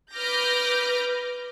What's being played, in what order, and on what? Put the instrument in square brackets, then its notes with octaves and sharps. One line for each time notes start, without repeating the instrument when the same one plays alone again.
[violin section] B4 D6 F6 G6 A#6